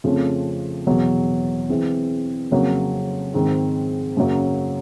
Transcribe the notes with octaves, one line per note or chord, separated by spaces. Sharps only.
F2 C#3 F3 A3
E2 B2 F#3
E3 G#3 C4
F2 C#3 F#3 A#3
G#2 D#3 G#3 C4
F#2 C#3 F#3 A#3